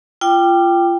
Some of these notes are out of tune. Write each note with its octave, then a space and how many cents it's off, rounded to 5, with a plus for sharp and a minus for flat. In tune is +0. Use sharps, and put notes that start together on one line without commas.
F4 -25 G5 +0 D6 +15